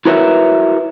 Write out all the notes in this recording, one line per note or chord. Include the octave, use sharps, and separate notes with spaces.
E4 F#4 A#4 B4 C#5 E5